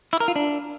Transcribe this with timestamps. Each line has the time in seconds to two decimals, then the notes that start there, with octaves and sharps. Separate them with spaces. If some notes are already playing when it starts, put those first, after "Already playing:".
0.13 E4
0.20 A#4
0.28 F4
0.36 D4